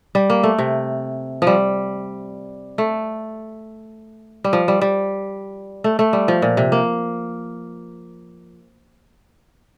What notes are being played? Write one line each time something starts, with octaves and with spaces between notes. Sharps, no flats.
G3
A#3
A3
C3
F3 G3
A3
G3
F3
G3
G3
A3
A3
G3
F3
A#2
C3
A#3